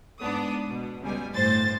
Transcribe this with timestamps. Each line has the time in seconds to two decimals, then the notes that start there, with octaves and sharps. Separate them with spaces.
0.21 G#2 B3 D4 D#6
0.69 B2
1.01 C#2 B2 G3 G#5
1.33 G1 A2 C5 A6